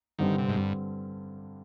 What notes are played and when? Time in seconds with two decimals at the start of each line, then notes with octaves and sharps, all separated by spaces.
0.19 G2 D3 D#3 G3 C4
0.38 C3
0.49 G#2
0.57 G2